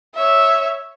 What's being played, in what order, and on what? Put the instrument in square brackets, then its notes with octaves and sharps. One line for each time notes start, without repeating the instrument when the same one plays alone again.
[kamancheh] C#5 E5